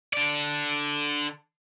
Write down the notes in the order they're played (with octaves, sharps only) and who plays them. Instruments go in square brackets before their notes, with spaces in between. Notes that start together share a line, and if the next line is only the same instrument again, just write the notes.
[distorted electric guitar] D3 D5